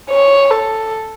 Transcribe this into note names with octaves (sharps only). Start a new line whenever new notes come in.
C#5
A4